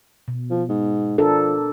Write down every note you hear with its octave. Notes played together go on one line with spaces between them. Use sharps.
B2
F3
G#2
F3 D4 A4 A#4